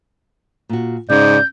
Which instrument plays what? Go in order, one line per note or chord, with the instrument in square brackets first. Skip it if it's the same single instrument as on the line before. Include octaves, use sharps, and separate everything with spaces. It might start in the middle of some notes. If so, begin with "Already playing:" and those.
[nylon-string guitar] A#2 F#4
[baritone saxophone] G#2 [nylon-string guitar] C#3 [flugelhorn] D5 [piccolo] G6